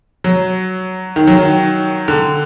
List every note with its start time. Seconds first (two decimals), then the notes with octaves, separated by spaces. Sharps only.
0.24 F#3
1.16 D#3
1.27 F#3
1.39 D#3
2.08 D3